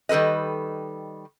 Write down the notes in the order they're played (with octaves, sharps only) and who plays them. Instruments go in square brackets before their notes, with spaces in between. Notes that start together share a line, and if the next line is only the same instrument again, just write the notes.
[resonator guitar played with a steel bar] D#3 G3 A4 B4 D#5